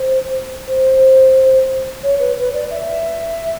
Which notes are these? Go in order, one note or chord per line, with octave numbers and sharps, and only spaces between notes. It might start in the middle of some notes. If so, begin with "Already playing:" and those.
Already playing: C5
C5
C#5
B4
B4
D5
E5